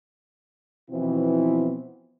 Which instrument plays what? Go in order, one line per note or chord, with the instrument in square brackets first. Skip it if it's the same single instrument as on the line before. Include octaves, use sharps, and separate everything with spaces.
[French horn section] B2 E3 F3 B3 C4 E4